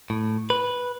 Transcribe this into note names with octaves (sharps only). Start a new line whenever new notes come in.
A2
B4